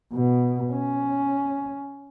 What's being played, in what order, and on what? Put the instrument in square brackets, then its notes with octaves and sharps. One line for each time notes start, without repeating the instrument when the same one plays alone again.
[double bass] B2
C#4